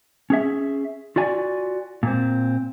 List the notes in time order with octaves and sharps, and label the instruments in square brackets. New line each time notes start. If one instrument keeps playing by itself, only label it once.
[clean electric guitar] C#4 G#4 E5
F4 F#4 D5 G#5
A#2 C4